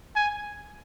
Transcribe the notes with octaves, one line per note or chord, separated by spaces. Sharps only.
G#5